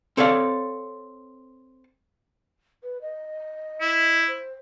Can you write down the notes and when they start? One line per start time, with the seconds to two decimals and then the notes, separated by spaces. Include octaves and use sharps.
0.17 C4 A4 C#5 D5 F5
2.83 B4
3.02 D#5
3.81 E4
4.28 C5